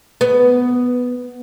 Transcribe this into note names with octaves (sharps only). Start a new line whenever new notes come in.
B3